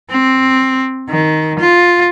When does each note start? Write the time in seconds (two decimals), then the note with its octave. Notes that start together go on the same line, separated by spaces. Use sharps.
0.10 C4
1.09 D#3
1.60 F4